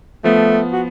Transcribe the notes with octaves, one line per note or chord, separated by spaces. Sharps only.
F3 A3 B3
F#4